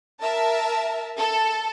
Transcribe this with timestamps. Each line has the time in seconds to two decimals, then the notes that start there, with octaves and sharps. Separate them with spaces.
0.21 A#4 E5 A5
1.18 A4